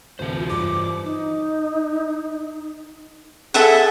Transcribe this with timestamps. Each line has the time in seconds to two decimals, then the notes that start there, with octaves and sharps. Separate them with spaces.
0.19 D2 C3 E3 C5
0.37 F4
0.50 G2 D6
1.03 D#4
3.54 G#4 A4 E5 F#5